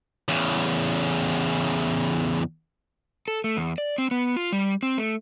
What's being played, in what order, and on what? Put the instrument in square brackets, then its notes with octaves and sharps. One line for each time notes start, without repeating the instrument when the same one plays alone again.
[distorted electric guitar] E2 C#3
[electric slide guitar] A4
A3
E2
D5
C4
B3
F4
G3
C4
A3